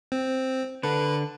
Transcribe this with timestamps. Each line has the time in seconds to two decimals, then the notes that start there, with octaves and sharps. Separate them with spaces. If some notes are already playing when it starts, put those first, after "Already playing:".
0.12 C4
0.83 D3 A4 B4